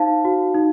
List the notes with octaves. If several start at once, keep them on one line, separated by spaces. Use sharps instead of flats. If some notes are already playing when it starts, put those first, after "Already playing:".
Already playing: D#4 C5 F5 A5
F#4
D#4